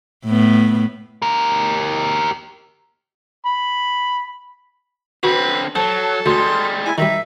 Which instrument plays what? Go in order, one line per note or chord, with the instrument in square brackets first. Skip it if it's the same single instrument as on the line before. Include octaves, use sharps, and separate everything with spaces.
[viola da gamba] A2 B3
[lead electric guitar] G4 A#4
[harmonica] B5
[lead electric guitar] D3 C4 [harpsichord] F#4 [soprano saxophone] B4
[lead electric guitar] F#3 [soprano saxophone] A4 [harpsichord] C5 [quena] A5
[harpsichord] D2 [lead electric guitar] G3 G#3 [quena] C6
[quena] E4 [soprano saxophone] G#5
[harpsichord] D#3 G3 [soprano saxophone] D#4 [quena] E5